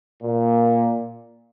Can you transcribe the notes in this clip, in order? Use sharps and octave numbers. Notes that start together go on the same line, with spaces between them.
A#2